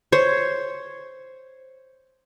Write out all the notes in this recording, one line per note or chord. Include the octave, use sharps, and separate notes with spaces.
C5 C#5